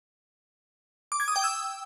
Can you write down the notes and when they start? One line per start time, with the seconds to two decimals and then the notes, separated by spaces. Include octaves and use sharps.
1.12 D6
1.20 G#6
1.28 D#6
1.36 G5
1.44 E6